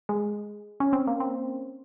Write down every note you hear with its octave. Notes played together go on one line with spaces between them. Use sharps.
G#3
C#4
C4
A#3
C4